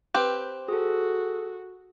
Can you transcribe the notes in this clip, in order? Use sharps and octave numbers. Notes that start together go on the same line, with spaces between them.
C4 G4 B4
F#4 G#4 A4